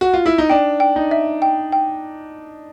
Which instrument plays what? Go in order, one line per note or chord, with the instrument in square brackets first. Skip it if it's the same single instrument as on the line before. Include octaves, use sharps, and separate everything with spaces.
[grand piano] F#4
F4
E4
D#4
[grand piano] D4 [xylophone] G5
[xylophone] G5
[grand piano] D#4
[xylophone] E5
G5
G5